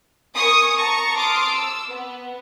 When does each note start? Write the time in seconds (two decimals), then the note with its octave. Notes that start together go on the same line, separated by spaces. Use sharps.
0.35 A#4 G#5 C#6 D#6
0.75 A5 A#5 C#6
1.17 A5 C6 D6 D#6 F6
1.51 E6
1.90 B3